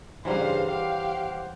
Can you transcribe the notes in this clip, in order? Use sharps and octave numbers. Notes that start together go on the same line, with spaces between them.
G2 C#3 E3 F#3 G3 C5 F5
G4 C5 F5 F#5